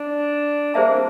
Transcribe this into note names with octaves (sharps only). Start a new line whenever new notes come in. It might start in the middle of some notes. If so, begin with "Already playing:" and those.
Already playing: D4
A#3 G#4 C5 E5 A5
C4